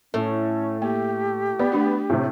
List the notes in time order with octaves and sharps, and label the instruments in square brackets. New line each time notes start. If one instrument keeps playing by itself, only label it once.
[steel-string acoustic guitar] A2 [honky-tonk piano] A3 [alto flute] C#4
[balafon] A#3 [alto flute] G4
[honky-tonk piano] B3 [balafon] D5
[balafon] A3 D4 F#4
[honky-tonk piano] A2 C3